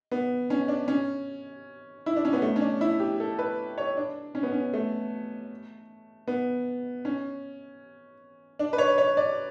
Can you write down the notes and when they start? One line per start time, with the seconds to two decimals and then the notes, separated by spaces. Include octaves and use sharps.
0.11 B3
0.50 C#4
0.68 D4
0.88 C#4
2.06 E4
2.16 D4
2.25 C#4
2.33 B3
2.42 A3
2.56 C#4
2.61 D4
2.81 E4
3.00 G4
3.20 A4
3.39 B4
3.78 C#5
3.97 D4
4.35 C#4
4.43 B3
4.52 C#4
4.74 A3
6.28 B3
7.05 C#4
8.59 D4
8.73 B4
8.78 C#5
8.98 C#5
9.17 D5